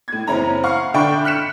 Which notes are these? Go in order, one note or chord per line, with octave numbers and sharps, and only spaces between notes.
A2 G#6
F#1 C4 C#4 E4 A#5 B5
F5 F#5 C#6 F6
D3 D4 E5 G5 B5 C#6
F6 F#6 B6 C#7 E7